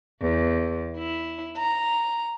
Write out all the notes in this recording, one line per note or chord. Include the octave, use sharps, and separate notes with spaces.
E2
E4
A#5